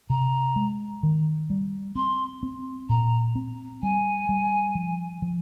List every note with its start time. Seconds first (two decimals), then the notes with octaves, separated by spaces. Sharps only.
0.10 C3 A#5
0.56 G#3
1.03 D#3
1.50 G3
1.95 C4 C6
2.43 C4
2.89 A#2 A#5
3.35 C4
3.82 G3 G#5
4.29 G3
4.75 F3
5.22 F3